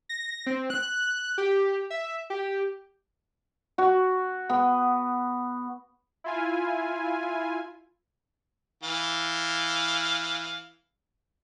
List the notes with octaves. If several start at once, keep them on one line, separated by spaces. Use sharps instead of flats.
A#6
C4
F#6
G4
E5
G4
F#4
B3
E4 F4 G#5
E3 F5